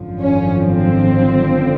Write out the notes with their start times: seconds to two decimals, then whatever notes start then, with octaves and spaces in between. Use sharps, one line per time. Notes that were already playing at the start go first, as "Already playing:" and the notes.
Already playing: G#1 F#2 D3 F3
0.21 C#4
0.60 C4